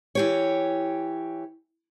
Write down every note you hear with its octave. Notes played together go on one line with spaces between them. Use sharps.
E3 G4 C#5